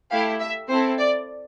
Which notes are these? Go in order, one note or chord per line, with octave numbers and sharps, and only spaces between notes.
A3 E4 G4 F5
E5
C4 E4 A4 C5
D5